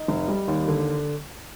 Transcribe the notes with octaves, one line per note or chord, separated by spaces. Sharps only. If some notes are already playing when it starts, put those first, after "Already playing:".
Already playing: D#4
F1
G3
D#2
D3